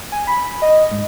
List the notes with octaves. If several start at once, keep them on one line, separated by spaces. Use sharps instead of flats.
G#5
B5
D#5
G#2